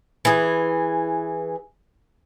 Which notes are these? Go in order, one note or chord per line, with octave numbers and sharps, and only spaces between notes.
E3 G#4